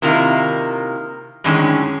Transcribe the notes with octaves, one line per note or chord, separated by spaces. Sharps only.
C3 D#3 A#3 E4 F4
F#2 A2 D3 D#3 G#3 C#4